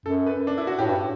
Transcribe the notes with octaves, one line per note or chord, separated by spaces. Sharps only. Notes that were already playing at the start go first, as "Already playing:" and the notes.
F#2 A4
B4
D4
E4
F#4
A2 G4
G2